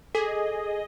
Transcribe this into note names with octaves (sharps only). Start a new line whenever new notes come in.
G#4 A4 D#5